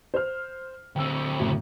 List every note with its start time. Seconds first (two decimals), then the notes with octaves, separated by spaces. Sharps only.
0.14 C5 F6
0.96 D2 C4 G5 E6
1.40 F#2 A2 C#3